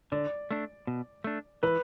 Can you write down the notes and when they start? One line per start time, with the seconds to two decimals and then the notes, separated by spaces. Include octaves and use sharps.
0.12 D3 D5
0.51 A3 D4
0.87 B2
1.24 A3 D4
1.63 E3 B4